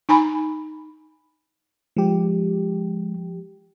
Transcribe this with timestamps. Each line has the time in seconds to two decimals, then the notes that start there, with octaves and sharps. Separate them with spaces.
0.09 D#4 G#5 A#5 B5
1.97 F3 G#3 G4